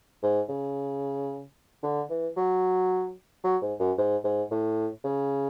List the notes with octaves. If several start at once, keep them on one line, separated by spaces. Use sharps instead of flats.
G#2
C#3
D3
E3
F#3
F#3
G#2
F#2
G#2
G#2
A2
C#3